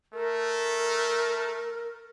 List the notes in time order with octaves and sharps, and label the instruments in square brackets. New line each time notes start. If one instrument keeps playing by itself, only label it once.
[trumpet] A3 [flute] A#4